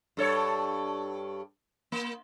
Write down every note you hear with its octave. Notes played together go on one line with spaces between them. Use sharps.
G2 A4 C#5
A#3